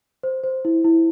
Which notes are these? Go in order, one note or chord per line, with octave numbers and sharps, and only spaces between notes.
C5
C5
E4
E4